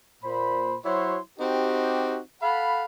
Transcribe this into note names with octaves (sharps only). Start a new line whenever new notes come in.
A#2 C5 B5
F#3 E4 F#4 C5 C#5 C6
C4 D#4 F#4 G4
A4 F5 F#5 B5